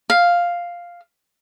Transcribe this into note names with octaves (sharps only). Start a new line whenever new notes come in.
F5